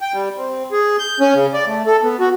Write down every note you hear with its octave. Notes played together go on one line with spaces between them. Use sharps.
G5
G3
C4
G#4
G6
C#4
C#3
D5
A3
A4
B3
F#4